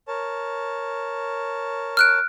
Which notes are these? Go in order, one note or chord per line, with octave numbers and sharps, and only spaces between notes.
A#4 C#5 A5
F6 F#6 D7